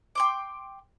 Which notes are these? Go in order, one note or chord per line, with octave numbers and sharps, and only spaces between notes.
G5 C6 D6